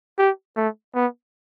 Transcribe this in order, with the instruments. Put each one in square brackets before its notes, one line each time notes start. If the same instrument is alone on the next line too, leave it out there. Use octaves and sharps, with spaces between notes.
[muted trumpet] G4
A3
B3